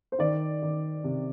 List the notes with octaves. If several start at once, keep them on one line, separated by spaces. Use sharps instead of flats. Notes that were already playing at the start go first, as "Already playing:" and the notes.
C5
D#3 D5
D#3
C3